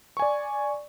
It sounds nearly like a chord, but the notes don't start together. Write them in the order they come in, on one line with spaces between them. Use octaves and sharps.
C#6 G#5 D5